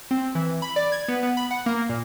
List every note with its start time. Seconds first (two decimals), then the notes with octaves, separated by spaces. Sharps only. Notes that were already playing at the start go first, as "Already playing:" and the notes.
0.11 C4
0.35 E3
0.62 B5
0.76 D5
0.92 G#6
1.08 B3
1.23 B3
1.37 B5
1.51 F#5
1.66 A#3
1.89 A#2